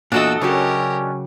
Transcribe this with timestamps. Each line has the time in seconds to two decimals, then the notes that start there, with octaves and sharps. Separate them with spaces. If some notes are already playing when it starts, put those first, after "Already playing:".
0.12 E2 A#2 D4 F#4 A4 D#5 E6
0.41 C#3 F#3 C#4 F#4 G4 A#4